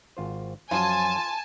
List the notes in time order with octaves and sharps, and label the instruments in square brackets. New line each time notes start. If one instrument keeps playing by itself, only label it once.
[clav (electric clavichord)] G#1 F4 C5
[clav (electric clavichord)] F#2 F3 F#3 [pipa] F4 [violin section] G#5 A5